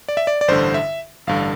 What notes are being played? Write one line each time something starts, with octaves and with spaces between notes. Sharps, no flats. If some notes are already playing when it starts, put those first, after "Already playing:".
D5
E5
D5
D5
A1 G2 D3 C5
E5
A1 G2 D3 F5